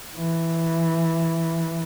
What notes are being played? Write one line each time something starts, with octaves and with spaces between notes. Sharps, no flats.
E3